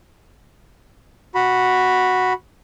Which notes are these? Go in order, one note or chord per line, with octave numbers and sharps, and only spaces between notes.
F#4 B5